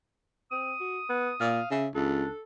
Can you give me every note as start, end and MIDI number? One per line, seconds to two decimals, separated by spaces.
0.51 0.74 60
0.51 1.81 87
0.80 0.99 66
1.09 1.31 59
1.40 1.61 46
1.40 1.67 77
1.71 1.88 49
1.71 1.86 76
1.95 2.25 37
1.95 2.31 62
1.95 2.42 69